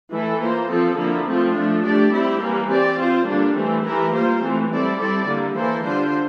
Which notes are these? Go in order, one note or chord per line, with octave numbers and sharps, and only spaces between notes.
E3 A3 E4 A4
A#3 F4 C5
F3 C4 F4 A4
D3 F3 A#3 E4
F3 A3 C4 F4
F3 A3 D4
A3 D4 G4 D5
G3 C4 E4 G4
E3 G3 A#3
C4 G4 D5
C4 F4 C5
D3 G3 A#3 D4
E3 A3 C4
E3 A3 E4 G4 A#4
G3 A#3 F4 C5
E3 A3 C4
G3 C4 E4 A4 D5
G3 C4 E4 A4 D5
D3 G3 A#3 E4
E3 A#3 E4 A4 C5
D3 G3 D4 F4 C5